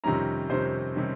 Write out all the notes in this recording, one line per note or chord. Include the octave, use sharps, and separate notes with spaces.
F2 C3 D#3 G3 C#4 A#5
F2 C3 D#3 G3 C#4 C5
C3 D#3 G3 C#4